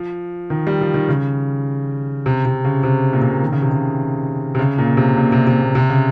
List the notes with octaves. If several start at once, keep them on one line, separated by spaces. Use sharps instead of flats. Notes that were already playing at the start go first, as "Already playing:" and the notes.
Already playing: F3
D#3
G3
F3
D#3
C#3
C3
C3
C#3
C3
A#2
C3
A#2
D#3
C#3
C3
C#3
C3
C#3
A#2
C3
A#2
C3
C3
A#2
C3
C#3